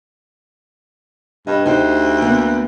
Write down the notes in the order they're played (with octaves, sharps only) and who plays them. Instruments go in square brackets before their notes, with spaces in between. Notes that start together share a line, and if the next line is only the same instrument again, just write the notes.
[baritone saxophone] G2 [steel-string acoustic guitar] D#5
[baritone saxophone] D2 [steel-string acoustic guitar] D#4 G4 C5
[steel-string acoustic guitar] A#3 B3